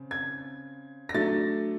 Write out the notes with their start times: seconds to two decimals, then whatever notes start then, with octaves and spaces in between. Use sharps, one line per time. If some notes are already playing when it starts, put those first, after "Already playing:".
Already playing: C#3 C4
0.11 G#6
1.09 A#6
1.14 F#3 A3 D4 A6